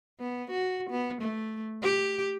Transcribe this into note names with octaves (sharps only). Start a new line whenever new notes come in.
B3
F#4
B3
A3
G4